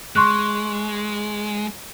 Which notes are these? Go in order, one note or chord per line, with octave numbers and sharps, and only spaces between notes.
G#3 C6 C#6 F#6